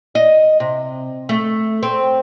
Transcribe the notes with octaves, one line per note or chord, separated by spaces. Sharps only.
D#5
C3
A3
C4